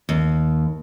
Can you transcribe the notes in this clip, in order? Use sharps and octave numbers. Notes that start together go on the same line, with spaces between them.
D#2